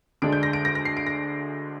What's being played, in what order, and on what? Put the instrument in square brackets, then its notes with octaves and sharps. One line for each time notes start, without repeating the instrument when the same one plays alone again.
[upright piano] D2 D3 G#3 D4 D7
G6
A#6
D7
A#6
A#6
C7
D7
A#6